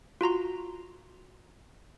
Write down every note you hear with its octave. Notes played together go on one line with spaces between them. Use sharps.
F4 F#4 A#5 C6